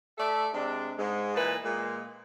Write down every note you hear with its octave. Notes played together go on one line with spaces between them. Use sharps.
A3 A4 D5 E5
C3 G#3 D4
G#2 G#3
A#2 E3 B4 D#5 A5
A#2 G#3